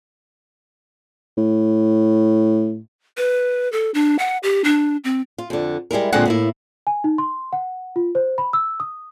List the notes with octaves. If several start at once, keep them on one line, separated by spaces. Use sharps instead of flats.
A2
B4
A4
D4
F#5
G4
D4
C4
F4
F2 D3
G3 G#3 E4 A#4
A#2 D3 G#3 C4 F#5
A2 A#3 E4
G#5
D#4
C6
F#5
F4
C5
B5
E6
D#6